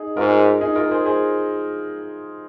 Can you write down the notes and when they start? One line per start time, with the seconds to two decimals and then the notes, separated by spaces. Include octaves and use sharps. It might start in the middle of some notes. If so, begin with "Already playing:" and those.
Already playing: D#4 G#4
0.17 G#2 F4 A#4
0.61 D#4 G#4
0.76 F4 A#4
0.91 G#4 C5
1.05 G#4 C5